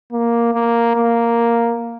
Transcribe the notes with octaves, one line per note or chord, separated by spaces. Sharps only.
A#3
A#3
A#3